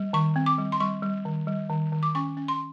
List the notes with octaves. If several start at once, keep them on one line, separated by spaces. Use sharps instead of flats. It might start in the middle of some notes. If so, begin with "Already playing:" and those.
Already playing: G3
D#3 C#6
C4
D6
G3
C6
G3 C#6
G3
D#3
G3
D#3
D#3
D6
C#4 C#6
C#4
C6